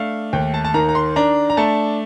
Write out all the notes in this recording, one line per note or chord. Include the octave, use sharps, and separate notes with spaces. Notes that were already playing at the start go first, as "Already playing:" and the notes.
Already playing: A3 D4 F5
D#2 G5
A5
A5
D#3 A#5
A#5
C6
D4 A#5
A#5
A3 A5